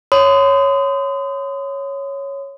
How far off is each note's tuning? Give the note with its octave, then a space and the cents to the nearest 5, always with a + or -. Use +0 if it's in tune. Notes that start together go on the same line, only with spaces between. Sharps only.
C#5 +0 C6 -40 D#6 +0